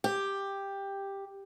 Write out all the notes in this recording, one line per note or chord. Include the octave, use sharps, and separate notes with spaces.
G4